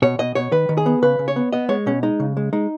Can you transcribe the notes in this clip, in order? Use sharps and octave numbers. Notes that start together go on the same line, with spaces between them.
B2 C#5
B2 D#5
B2 C#5
D#3 B4
D#3
G#4
B3
C#3 B4
C#3
C#5
B3
B3 D#5
G#3 C#5
B2 C#4
G#3 D#4
C#3
G#3
G#3 D#4